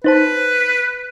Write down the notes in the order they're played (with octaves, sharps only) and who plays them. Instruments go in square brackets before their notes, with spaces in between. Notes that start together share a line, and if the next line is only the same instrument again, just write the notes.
[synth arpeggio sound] D#4 C5 A5 [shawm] B4